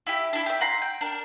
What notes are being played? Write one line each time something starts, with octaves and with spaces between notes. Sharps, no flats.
E4 G4
D4 E4
G4 E5
F#5 A#5 C6
G5
D4 A#4